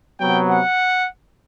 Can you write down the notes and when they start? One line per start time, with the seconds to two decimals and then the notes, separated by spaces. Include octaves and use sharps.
0.20 C3 F#3 B3 G5
0.50 F#5